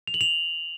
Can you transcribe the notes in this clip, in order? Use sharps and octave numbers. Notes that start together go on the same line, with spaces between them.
F7
F#7
F7